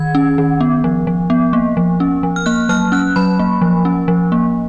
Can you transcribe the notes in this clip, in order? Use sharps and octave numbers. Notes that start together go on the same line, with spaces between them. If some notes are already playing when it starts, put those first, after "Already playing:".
Already playing: D#3 G#6
C#4
D#3
B3
F3
F3
B3
A#3
F3
C#4
F3
F6
A#3 F#6
F#3 F6
C#4 F#6
F#3 B5
A#3
F3
C#4
F3
A#3